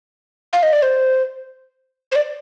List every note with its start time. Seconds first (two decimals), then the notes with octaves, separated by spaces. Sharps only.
0.53 F5
0.63 D#5
0.73 D5
0.82 C5
2.12 C5
2.15 D5